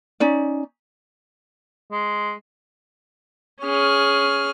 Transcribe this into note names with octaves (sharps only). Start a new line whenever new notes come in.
C#4 D#4 D5
G#3
C#4 G#4 F6